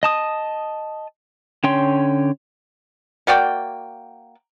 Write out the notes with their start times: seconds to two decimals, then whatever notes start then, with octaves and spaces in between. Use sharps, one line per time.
0.03 D#5 A5 D#6
1.64 D3 C#4 C#5 G5 C6
3.27 A#3 F#4 D5 G5